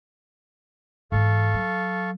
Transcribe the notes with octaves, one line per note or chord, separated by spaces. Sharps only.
G#2 E3 A4 F5 C#6
F#3